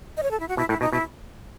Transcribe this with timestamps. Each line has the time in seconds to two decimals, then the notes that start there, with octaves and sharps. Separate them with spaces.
0.17 D#5
0.23 C#5
0.31 A4
0.40 E4
0.48 F#4
0.57 B2 E4
0.69 A2 E4
0.81 B2 D#4
0.92 B2 E4